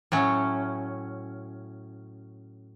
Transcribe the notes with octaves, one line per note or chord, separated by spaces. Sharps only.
A2 F#3 C#4